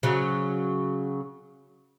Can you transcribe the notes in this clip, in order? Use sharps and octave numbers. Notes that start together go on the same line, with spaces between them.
C#3 F#3